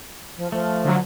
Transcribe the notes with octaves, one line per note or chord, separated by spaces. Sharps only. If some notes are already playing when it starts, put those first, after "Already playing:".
F3
F3 A3
D3 F#3